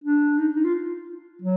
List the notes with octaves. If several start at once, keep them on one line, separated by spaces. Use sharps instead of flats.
D4
D#4
D#4
F4
F#3